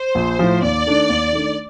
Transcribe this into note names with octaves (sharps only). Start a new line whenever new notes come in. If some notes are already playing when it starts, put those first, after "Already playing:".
Already playing: C5
A#1
A2 F3
D#2 D5
D#3 A3 D4
D#2
D#3 A3 D4